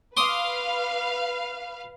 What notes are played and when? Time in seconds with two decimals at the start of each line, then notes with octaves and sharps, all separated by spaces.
0.17 B4 F5 C6 D6 D#6